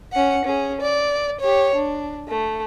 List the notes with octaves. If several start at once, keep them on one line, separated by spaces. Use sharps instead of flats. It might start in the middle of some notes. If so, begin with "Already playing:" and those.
C#4 F#5
C#4 G#4
D5
G4 C#5
D4
A3